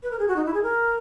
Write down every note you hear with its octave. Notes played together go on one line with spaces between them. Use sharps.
B4
A#4
G#4
F#4
D#4
E4
G#4
A#4